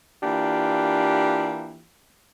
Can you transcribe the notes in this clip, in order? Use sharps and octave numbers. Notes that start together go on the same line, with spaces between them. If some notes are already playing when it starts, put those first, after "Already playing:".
E3 A#3 D4 F4 G4